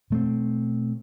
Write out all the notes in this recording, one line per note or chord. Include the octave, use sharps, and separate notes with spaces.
B2 A3 C4